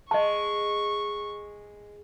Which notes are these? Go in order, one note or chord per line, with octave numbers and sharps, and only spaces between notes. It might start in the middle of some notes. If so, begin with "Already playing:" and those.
G#3 D#5 A5 C#6